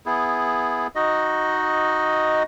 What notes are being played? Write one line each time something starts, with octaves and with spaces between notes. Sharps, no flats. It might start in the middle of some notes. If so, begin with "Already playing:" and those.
B3 E4 G#4
D#4 F#4 D#5